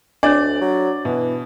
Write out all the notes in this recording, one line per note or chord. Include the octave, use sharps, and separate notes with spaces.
D2 D4 C#5 D5
F#3
B2 E3